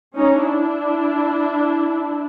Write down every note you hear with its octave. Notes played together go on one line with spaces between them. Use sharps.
C#4 D#4
D4 E4